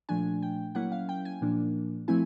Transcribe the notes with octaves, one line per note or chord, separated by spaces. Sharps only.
A#2 F3 A3 D4 G#5
G5
F#3 A#3 C#4 E4 F#5
F5
G5
G#5
A#2 F3 A#3 D4
F3 A3 C4 E4 G#5